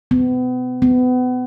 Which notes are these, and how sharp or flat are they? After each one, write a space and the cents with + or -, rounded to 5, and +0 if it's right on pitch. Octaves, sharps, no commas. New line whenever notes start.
B3 +35
B3 +30